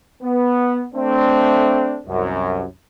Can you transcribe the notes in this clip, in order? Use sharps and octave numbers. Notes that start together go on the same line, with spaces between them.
B3
A3 C4 D4
C2 F#2